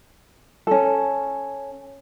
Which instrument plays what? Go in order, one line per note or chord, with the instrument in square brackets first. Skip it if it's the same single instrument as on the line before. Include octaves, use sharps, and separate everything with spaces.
[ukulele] C#4 A4